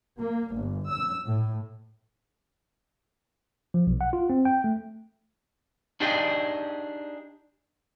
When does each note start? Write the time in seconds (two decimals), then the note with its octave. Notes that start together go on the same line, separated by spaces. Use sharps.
0.20 A#3
0.54 G1
0.89 E6
1.26 A2
3.74 F3
3.87 B1
4.01 F#5
4.13 F4
4.30 C4
4.45 G5
4.64 A3
6.00 D4 D#4 G4 G#4 D5 D#5